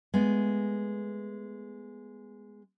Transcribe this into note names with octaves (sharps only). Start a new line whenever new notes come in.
G#3 A3 B3